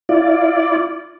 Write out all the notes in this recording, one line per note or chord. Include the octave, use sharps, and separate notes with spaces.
E4 F4 D5